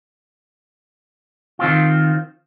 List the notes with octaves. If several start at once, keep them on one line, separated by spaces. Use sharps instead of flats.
D#3 C4 F4